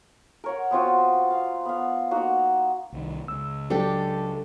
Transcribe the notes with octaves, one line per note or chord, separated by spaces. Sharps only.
A#4 C#5 F#5
B3 C4 F4 F#4
F5
B3 F5
A#3 D#4 F#4
C2 D#3
C#2 E6
F#3 D4 G4 A4